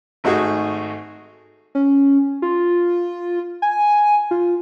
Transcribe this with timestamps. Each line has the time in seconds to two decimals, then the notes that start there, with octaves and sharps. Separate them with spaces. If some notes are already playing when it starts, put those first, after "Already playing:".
0.24 G#1 A3 D#4 F#4 G#4
1.75 C#4
2.42 F4
3.62 G#5
4.31 F4